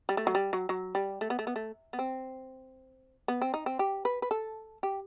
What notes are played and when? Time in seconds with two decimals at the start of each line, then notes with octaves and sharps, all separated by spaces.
0.09 G3
0.17 A3
0.27 F#3
0.35 G3
0.53 F#3
0.69 F#3
0.95 G3
1.21 A3
1.30 B3
1.39 A3
1.47 B3
1.56 A3
1.93 B3
1.99 C4
3.28 B3
3.41 C4
3.54 D#4
3.66 C4
3.79 G4
4.05 B4
4.22 B4
4.31 A4
4.83 G4